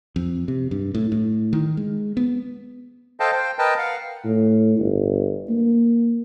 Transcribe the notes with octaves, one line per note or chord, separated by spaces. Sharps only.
F2
C3
G2
A2
A2
D#3
G#3
B3
A4 C5 D#5 F5 G5 A5
C5 G5
A#4 B4 D#5 G5 A5
F5 F#5
A2
G1
A#3